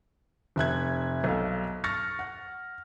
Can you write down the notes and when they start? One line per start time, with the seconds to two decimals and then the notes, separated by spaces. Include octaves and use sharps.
0.56 F1 E5 F#6 G#6
1.24 B1 A4 F5
1.84 C#6 F6 A6 A#6 C#7
2.19 F#5